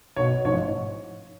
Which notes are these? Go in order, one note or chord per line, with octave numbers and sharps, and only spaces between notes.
B1 B2 C#5
A1 G#2 F3 C#5